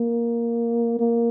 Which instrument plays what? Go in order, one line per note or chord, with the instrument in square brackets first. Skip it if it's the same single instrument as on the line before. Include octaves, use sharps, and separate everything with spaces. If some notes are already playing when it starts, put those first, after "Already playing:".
Already playing: [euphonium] A#3
A#3